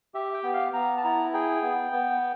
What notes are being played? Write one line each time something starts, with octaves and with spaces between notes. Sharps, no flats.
G4 E5
G5
B3
F5
B3 A#5
A5
E4 A#5
G#4 G5
B3
B3